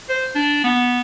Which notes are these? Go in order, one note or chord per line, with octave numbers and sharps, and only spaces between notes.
C5
D4
B3